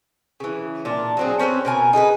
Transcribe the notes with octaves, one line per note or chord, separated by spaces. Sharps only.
C#3 E3
A#2 D4
F#3 C4 G#4
C4 C#4 A#4 B4
B2 A#4 G#5
D#4 G#4 A4 B4